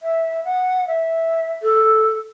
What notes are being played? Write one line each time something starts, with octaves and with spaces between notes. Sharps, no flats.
E5
F#5
E5
A4